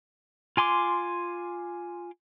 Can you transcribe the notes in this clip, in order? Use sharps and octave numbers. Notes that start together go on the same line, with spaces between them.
F4 G#5 C6 D6